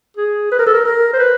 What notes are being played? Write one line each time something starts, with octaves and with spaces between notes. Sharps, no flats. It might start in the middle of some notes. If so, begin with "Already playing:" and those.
G#4
B4
A#4
A4
A#4
A#4
C5
B4